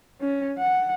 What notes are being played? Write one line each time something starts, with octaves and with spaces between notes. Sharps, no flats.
C#4
F#5